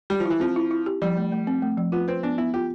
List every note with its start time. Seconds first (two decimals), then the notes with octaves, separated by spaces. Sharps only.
0.10 G3 G4
0.20 F3
0.25 E3 E4
0.40 F3 C4
0.56 E4
0.71 E4
0.86 G4
1.02 F3 G3
1.17 A3
1.32 A3
1.47 C4
1.62 A3
1.78 F3
1.92 B3 F4
2.08 C4 B4
2.23 B3 D4
2.38 B3 E4
2.54 F4 G4